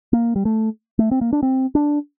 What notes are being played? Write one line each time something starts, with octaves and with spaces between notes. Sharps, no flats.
A#3
G3
A3
A3
C4
A#3
D4
C4
D4